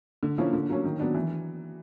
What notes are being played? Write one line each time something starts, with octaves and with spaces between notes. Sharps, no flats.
D3
F3 A#3 C#4 E4
D3
F#3 A#3 C#4
D#3
F#3 B3 D4
E3